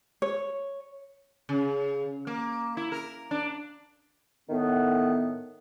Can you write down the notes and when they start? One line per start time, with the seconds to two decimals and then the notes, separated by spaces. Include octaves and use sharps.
0.22 C#5
1.49 C#3
2.27 A#3
2.77 E4
2.92 A#4
3.31 D4
4.49 A2 D#3 B3